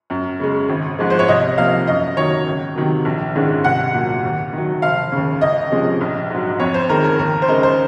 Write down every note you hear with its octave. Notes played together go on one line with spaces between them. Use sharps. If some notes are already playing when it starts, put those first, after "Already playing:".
F#2
C#3 G#3
G#1
G#2 F3 G#3
C5
C#5
C2 D#5
C3 F3 A#3 F5
F#2 D#5
D#3 F#3 C#5
C#2
C3 D#3 F#3
A#1
G#2 D#3 G#3 C#4
C2 F#5
A#2 F#3
D#2
D#3 F#3
F1 F5
D#2 C#3
C#2 D#5
C3 F3 G#3 C#4
A#1
G#2 F#3
F2 C#5
C5
D#3 G#3 A#4
A#4
D#2 A#4
C5
C#3 G#3 D#4 A#4
C5